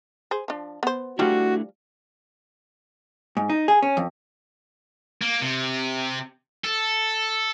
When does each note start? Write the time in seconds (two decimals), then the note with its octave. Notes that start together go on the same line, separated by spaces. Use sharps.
0.31 G#4 C5
0.48 F3 D4
0.83 B3 C5
1.19 F3 G3 A3 D4 E4 F#4
3.37 G#2
3.50 D#4
3.68 G#4
3.82 C#4
3.97 F2
5.22 A#3
5.41 C3
6.64 A4